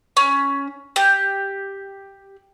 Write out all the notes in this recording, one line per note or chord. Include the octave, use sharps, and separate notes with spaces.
C#4
G4